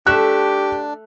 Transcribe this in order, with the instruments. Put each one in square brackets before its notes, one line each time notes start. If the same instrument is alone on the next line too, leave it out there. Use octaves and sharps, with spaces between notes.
[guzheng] A3 E5 [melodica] D4 [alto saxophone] G4 [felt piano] F#6